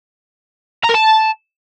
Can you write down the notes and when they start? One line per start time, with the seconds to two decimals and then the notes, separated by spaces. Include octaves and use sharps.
0.84 A#5
0.89 A#4
0.94 A5